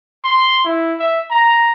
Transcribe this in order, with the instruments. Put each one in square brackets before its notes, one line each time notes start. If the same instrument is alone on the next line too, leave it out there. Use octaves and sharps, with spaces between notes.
[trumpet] C6
E4
E5
A#5